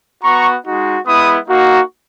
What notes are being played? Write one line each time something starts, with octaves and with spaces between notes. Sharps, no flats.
B3 F#4 A#5 C#6
G#3 D#4 F#4
G#3 B3 E4 B5 D#6
A#3 D#4 F#4